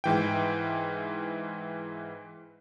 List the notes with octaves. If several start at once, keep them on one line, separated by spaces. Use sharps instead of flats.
G#2 E3 G5